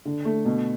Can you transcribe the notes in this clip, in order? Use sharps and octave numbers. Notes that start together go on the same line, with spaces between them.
D3
A3
B2